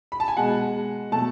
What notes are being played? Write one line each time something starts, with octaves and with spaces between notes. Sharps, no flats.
B5
A5
G#5
B2 G#3 F#5
B2 F#3 A3 A5